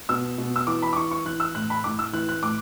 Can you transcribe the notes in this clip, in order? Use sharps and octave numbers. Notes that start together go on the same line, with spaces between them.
B2 E6
B2
E6
E3 D6
B5
D6
E3 C#6
C#6
E3 F#6
E6
A2 F#6
B5
A2 D6
E6
E3 F#6
F#6
A2 D6